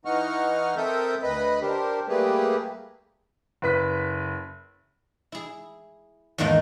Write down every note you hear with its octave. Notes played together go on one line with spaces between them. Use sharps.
E3 D#4 D#5 F#5 C#6 F6
C4 A4 A#4 E5 D#6 G6
D2 B4 D#5 B5
D4 G4 A#4 C5
G3 A3 A#3 G4 G#4 B4
F#1 B4 B6
E4 G#4
E2 G#2 D#3 A3 A#3 D#4